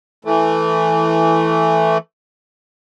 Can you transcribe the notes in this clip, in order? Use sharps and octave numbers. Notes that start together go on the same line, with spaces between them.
E3 A3